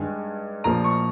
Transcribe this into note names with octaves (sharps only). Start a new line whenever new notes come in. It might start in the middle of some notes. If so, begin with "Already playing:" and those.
Already playing: G2 D#3 G#3 G#5
A#1 A#2 F3 A#3 A#5
C#6